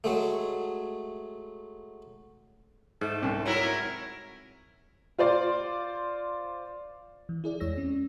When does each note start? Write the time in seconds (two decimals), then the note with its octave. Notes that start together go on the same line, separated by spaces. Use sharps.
0.04 F#3 G#3 A3
3.01 G#2 A3
3.22 C2
3.46 F#3 C#4 E4 A#4
5.19 F4 C5 D5 C6
7.29 E3
7.44 E4 G#4 D5
7.60 E2 G#3 C#5 E6 A#6
7.77 C4 C#4